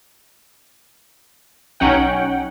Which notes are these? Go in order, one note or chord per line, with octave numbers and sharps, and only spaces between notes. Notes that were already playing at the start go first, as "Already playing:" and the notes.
B1 F#3 C#4 D#4 F#5 G5